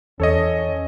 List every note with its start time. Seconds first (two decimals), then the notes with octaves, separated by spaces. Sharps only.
0.20 E2 C#4 A4 C#5 D#5